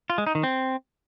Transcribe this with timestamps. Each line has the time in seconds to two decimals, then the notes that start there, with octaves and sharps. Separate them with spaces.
0.10 F4
0.18 G#3
0.27 D#4
0.35 D#3
0.43 C4